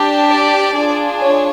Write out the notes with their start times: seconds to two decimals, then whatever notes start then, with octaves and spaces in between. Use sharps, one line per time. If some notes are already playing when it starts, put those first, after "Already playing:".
Already playing: D4 G4
0.30 D5
0.75 D4 F4 G#4
1.19 C#5